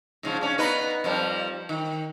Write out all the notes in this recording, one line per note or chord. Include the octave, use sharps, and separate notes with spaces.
G#2 C#3 F3
C#4 D4
B3 D#4 B4
F2 F3 G3
D#3